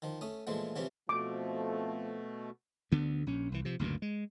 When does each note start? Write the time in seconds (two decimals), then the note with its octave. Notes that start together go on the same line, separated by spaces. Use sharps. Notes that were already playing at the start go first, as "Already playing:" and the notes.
0.02 D#3 F3
0.21 A3 C#4 D#6
0.47 A#2 E3 F3 G#3 A3
0.76 C3 E3 F3 G3 C#4
1.09 B2 F3 A3 C4 A4 D6
2.92 D2 D3 B3
3.27 A#1 C#4
3.52 C2 E3
3.65 C3 F3
3.79 F#1 D2 G2 A#2
4.02 G#3